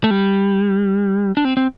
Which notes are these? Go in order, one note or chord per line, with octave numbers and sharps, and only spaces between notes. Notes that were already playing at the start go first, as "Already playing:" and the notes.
A3
G3
D4
C4
C4